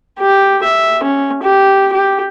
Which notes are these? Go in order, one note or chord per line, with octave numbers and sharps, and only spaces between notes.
G4
E5
C#4
G4
G4